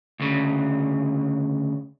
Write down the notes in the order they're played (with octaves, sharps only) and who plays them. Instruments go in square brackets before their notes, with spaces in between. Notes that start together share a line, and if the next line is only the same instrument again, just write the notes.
[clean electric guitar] D2 C#3